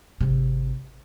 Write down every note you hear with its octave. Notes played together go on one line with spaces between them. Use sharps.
G#1 C3